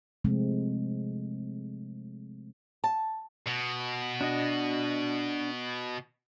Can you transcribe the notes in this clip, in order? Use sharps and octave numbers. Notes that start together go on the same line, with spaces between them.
C3 F3 G#3 A3 C4
A5
B2
D4 F#4 D#5